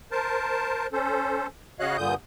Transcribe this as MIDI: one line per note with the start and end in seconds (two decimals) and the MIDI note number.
0.11 0.87 70
0.11 0.87 72
0.11 0.87 81
0.93 1.47 61
0.93 1.47 69
0.93 1.47 72
1.80 1.97 49
1.80 1.97 66
1.80 1.97 73
1.80 1.97 75
1.80 1.97 77
1.80 1.97 90
1.98 2.14 43
1.98 2.14 46
1.98 2.14 50
1.98 2.14 87
1.98 2.14 91